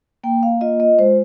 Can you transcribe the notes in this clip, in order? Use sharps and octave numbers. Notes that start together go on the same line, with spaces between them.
A#3 G5
F5
F4 D#5
D#5
G#3 C5